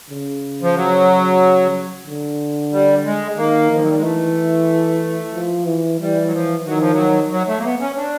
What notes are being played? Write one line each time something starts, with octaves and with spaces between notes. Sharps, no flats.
C#3
F3
F#3
D3
G3
G#3
D#3 A#3
D#3 F3
F#3
G3
G#3
E3 A3
F3
E3
E3 G3
F#3
F3
D#3 F#3
F3
F#3
F#3
A3
A#3
B3
C#4
D4